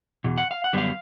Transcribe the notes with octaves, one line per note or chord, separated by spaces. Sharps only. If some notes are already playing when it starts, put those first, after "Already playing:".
E2 B2
F#5
F5
F#5
F#2 D3 G3 B3 D4 F5